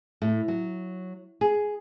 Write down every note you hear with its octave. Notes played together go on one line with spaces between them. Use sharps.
A2
F#3
G#4